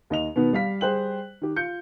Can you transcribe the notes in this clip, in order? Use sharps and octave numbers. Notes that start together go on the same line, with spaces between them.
D#2 D#5 F7
B2 D#3 B3
G3 F5 B6
G3 G#4 C5 G5 F#6 F#7
D#3 G4
F4 G6 C#7